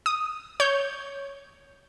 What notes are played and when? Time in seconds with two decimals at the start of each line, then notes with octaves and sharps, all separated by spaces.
0.06 D#6
0.60 C#5 G6